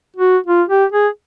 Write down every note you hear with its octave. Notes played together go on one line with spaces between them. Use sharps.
F#4
F4
G4
G#4